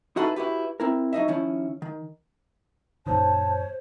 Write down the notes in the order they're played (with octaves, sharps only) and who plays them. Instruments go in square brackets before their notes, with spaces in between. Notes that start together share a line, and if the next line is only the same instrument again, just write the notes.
[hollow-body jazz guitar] D#4 E4 F#4 G#4 A4 B4
E4 F#4 G4 B4
C4 E4 A#4
F#3 D#4 D#5 E5
D#3 F3 C#4 E4
D#3
[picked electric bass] F#2 A#2 D#3 [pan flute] C5 [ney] C#5 [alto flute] A5